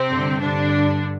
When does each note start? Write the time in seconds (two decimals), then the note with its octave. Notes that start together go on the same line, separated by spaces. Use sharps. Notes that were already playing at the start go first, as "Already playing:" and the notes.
Already playing: C3 C4
0.10 G2 D3
0.39 D3 D4